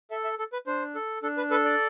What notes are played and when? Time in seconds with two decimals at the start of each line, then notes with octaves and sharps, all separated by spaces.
0.11 A4 E5
0.24 E5
0.39 A4
0.53 B4
0.67 D4 C5
0.95 A4
1.23 D4 A4
1.37 B4
1.51 A4 B4
1.65 D5